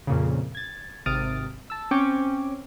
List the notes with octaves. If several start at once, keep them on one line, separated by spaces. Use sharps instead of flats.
F2 A#2 C#3
G#6 A6
G#1 C3 D#6 F6 A6 D7
A5 E6
C4 C#4 G5 C#6 D6